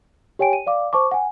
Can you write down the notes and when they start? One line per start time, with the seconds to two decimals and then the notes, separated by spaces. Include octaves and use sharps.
0.39 G4 C#5 G5 G#5 D7
0.53 D#7
0.67 D5 F5 D6
0.93 C5 A5 C#6 D6
1.11 F#5 G#5